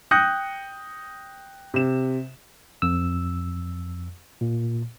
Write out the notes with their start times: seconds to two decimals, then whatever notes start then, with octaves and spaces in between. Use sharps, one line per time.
0.11 G5 D#6 F#6 G6 A#6 C#7
1.74 C3 E7
2.82 F2 E6
4.41 A#2